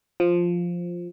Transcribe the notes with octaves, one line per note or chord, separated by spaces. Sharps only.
F3